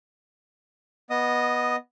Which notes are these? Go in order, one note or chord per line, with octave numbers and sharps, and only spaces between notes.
B3 D#5 D#6